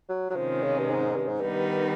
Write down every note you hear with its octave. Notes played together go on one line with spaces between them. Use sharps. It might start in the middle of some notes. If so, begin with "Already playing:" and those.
F#3
F#3
C3 D#3 F3 G#3 C#4
C#3
G2
G#2
G2
G#2
G2 D#3 G3 B3 D#4